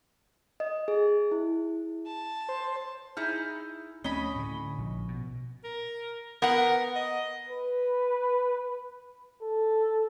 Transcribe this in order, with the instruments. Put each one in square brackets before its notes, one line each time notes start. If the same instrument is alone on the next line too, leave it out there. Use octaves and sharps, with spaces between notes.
[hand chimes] D#5
G#4
E4
[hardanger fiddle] A5
[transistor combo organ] C5
[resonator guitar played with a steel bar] D#4 E4 G#4 [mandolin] F6
[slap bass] D2 A3 C4 [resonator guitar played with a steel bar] C#4 [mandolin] D#5 B5
[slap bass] A2 D3
A#1
B2
[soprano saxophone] A#4
[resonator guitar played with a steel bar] B3 F#5 [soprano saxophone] A#4
[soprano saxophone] D#5
[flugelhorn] B4
A4